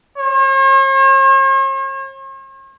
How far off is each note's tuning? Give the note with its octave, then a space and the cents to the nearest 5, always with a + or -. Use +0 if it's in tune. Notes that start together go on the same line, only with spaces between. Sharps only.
C#5 -45